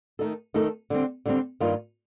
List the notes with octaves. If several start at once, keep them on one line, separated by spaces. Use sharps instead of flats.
D#3 A3 D#4 A4
D#3 A3 D#4 A4
D3 G3 C4
D3 G3 C4
G2 D#3 A#3 F4